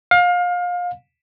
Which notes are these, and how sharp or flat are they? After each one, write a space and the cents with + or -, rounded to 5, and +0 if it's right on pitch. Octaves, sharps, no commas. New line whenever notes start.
F5 +25